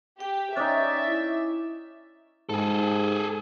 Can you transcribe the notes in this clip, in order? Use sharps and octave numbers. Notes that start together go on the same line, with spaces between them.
G4 G5
C#4 D#4 D5 E5 G#5
E4
G#2 G#4 A4